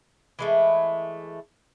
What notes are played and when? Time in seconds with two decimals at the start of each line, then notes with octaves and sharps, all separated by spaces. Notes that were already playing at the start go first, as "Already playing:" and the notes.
0.39 E3 G#3 A3